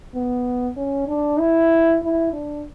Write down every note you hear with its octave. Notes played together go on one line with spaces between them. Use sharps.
B3
C#4
D4
E4
E4
D4